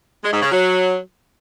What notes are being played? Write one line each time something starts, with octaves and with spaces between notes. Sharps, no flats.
G#3
G#2
C#3
F#3